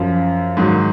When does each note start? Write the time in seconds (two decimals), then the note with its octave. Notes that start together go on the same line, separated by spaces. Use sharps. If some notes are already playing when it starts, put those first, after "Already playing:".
Already playing: F#2 F3
0.57 G#2 D#3 F#3